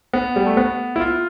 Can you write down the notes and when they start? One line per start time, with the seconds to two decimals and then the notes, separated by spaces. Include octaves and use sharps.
0.13 B3
0.36 G3
0.46 A3
0.57 B3
0.96 E4
1.00 F4